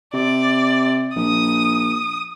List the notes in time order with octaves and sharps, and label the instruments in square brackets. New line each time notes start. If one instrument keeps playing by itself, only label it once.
[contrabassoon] C3 [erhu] D5
[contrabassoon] A#1 [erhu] D#6